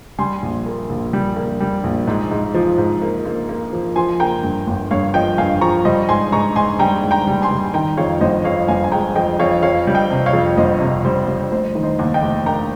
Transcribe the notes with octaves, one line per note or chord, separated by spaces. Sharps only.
G3 G#5 C6
A#1
A#3
A#1
G3
A#3
G3
A#1
G#2
G#2
F3
G#2
A#3
A#3
A#3
F3
F3 G#5 C6
A#3 G5 A#5
G2
G1
G2 C#5 F5
F3 D#5 G5
G2 F5 G#5
F3 A#5 C#6
G3 C5 D#5
G#2 G#5 C6
G#2 A#5 C#6
G#2 G#5 C6
G3 G5 A#5
G#2
G5 A#5
G3
G#5 C6
G3
D#3 G5 A#5
F2 C#5 F5
G1 C5 D#5
F2 C#5 F5
G1 F5 G#5
G#5
G#3 G5 A#5
F2 D#5 G5
F2 C#5 F5
F2 C#5 F5
G3
D#5 G5
C3
C#5 F5
F2
G1 C5 D#5
C3
G3 C5
G3
F1 C5
D#3
C5 D#5
D#2
D#5 G5
F1
A#3 G5 A#5